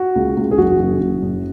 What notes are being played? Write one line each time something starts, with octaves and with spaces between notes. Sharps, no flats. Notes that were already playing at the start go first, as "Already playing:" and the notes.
Already playing: F#4
C#2
C#2
G#4
F#1 F#4
F#1
F#1
F#2